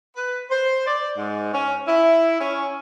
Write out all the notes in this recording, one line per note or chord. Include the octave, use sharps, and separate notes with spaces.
B4
C5
D5
G#2
C#4
E4
C#4